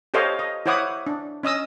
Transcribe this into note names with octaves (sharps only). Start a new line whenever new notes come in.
G4 A4 C5 C#5 D#5 F5
D#5
E4 C5 C#5 F#5 D6 D#6
D4
C#4 D#5 D#6 E6